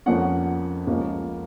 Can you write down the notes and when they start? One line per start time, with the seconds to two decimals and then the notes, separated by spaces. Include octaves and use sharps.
0.06 F2 F3 A#3 C#4 F#5
0.87 C#2 C#3 F3 A#3 C#4